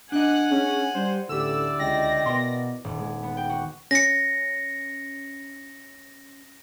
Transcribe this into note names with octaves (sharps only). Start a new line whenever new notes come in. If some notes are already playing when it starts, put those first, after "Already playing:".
D4 D#5 F#5 G#5 F#6
C#4 G#4
G3 C5
A1 D2 D3 E4 G4 A4 D5 E6
C#2 D#5 G5 A#6
B2 A#4 G5 C6
D#1
G#3
B3
G5
F#4
C#4 A#6 C#7